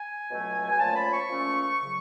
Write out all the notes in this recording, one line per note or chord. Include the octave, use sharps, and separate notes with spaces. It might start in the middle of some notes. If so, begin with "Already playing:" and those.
Already playing: G#5
C#2 B2 F#3 A3
G#5
A#2 F3 A3 C#4 A5
B5
C#6
A#2 F3 A3 C#4
C#3 F#3